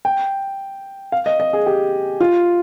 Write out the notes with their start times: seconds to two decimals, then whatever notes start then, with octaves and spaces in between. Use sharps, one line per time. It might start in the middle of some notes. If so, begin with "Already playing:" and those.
0.05 G5
1.12 F5
1.26 D#5
1.40 D#5
1.53 G#4
1.66 G4
2.21 F4